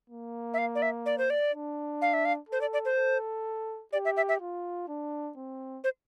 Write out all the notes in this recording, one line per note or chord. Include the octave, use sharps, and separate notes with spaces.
A#3
E5
F5
D5
E5
D5
C5
D5
D4
F5
E5
F5
A4 C5
D5
D5
C5
A4
G4 D5
E5
E5
E5
F4
D4
C4
C5